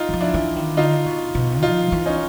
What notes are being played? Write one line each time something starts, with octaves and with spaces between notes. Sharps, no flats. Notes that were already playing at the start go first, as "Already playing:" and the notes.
Already playing: D#4 F4
E3
F3
D4 E4
E3
D#3
D3 D#4 F4
B2
B2
F3 D#4 F4
E3
C#4 D#4